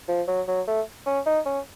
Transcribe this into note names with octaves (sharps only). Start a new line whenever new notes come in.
F3
F#3
F#3
A3
C#4
D#4
C#4